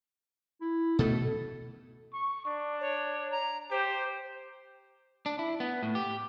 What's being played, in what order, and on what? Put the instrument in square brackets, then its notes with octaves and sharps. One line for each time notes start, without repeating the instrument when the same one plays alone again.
[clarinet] E4
[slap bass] B2 A3 [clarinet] A4
[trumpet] C#6
D4
[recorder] C#5
A#5
[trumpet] G4 [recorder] C5
[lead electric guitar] D4
E4
B3
A2
G4